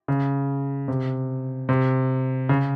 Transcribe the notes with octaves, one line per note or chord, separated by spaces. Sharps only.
C#3
C3
C3
C#3